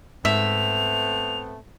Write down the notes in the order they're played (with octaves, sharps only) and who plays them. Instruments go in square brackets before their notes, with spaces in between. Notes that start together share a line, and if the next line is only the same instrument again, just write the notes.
[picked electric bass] G#2 [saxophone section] A3 B3 C4 [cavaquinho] E5 [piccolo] F7